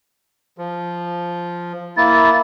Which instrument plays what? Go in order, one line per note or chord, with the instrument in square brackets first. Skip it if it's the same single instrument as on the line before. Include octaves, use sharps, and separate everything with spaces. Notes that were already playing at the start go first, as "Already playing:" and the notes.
[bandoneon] F3
[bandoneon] A#3 E4 [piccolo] A6